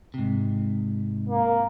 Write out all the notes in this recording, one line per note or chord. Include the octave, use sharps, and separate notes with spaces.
G#2 C3
A#3